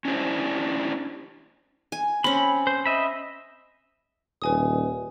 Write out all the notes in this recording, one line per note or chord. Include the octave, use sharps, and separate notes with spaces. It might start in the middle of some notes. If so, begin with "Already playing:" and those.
C#4 D4 E4 G4 C5
G#5
C4 C#4 B5
C5
D#5 E5 B5
D#1 B4 G#5 D#6